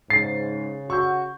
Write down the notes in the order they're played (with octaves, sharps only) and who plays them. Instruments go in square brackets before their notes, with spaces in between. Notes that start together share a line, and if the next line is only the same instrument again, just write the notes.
[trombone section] G#2 [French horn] C#3 [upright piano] A6 [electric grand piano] C7
[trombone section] F#4 [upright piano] C#6 E6 G6